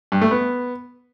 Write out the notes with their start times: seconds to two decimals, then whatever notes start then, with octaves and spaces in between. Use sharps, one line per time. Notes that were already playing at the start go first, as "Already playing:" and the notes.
0.12 G2
0.21 A3
0.31 B3